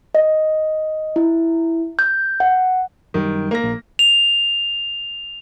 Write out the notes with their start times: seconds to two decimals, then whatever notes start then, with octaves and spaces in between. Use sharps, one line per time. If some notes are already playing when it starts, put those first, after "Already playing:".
0.15 D#5
1.16 E4
1.99 G6
2.40 F#5
3.14 F#2 D#3 G3
3.51 A#3 A#6
3.64 A#1
3.99 F7